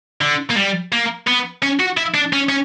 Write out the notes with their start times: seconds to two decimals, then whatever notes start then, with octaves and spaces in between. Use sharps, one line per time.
0.21 D3
0.50 A#3
0.57 G3
0.92 A#3
1.27 B3
1.63 C#4
1.80 F#4
1.97 E4
2.14 D4
2.33 C#4
2.49 C#4